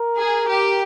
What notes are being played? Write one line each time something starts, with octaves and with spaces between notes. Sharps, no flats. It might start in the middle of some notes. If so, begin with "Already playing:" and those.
Already playing: A#4
G#4
G4